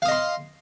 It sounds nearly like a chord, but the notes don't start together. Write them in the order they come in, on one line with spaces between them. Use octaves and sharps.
F5 D#6 D#5 C6